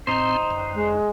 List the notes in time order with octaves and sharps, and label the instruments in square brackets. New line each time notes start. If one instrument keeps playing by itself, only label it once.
[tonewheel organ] A2 C4 [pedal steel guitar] D#4 C5
[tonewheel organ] G1 F#2
[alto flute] G#3